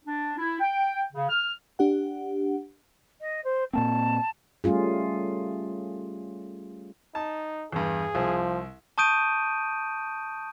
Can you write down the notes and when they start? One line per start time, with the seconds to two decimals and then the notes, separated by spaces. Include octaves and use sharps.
0.05 D4
0.38 E4
0.61 G5
1.13 C#3
1.29 F6
1.79 D4 G4 F#5
3.21 D#5
3.44 C5
3.73 A#2 A#3 C4 A5
4.64 G3 A3 C#4 F4 G#4
7.15 D#4 A5
7.72 E2 G2 G#4
8.15 C2 F3
8.98 A5 C#6 D#6 G6 D7 D#7